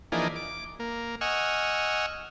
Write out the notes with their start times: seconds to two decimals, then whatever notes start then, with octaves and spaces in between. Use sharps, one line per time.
0.12 E3 F3 A#3 D4 D#4 G#4
0.36 D6
0.80 A#3
1.21 D#5 F#5 G#5 C#6 E6 F6